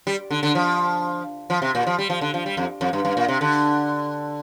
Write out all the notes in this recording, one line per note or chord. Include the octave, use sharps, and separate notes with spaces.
G3
D3
D3
F3
F3
C3
A#2
F3
G3
F3
D3
F3
G3
F2
F2
G2
G2
A#2
C3
D3